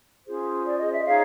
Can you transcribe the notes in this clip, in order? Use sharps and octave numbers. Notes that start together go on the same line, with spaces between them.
C#4 F4 G#4 C5
D5
D#5
E5
D#4 G#4 C#5 F5